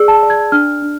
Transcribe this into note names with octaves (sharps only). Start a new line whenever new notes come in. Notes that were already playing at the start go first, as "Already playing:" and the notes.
Already playing: G#4 D5 E6
A5
D5
G#6
D4 F6
D4